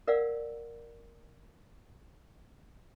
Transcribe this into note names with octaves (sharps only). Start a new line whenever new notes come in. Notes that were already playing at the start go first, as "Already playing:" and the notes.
A#4 D5 F5 F#5 E6